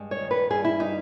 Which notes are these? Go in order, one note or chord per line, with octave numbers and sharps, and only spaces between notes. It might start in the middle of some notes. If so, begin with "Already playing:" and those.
Already playing: G2 G#3
C#5
D#3
B4
G2 G#4
E4
G3 D#4